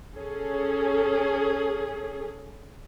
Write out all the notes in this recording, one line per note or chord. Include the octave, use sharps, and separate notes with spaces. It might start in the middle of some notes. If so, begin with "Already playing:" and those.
C#4 G#4 A4